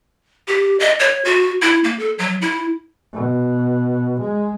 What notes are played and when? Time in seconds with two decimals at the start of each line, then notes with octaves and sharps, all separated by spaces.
0.48 G4
0.80 D#5
1.00 C#5
1.25 F#4
1.62 E4
1.84 A#3
1.99 A4
2.19 F#3
2.42 E4
3.13 B2
4.21 G#3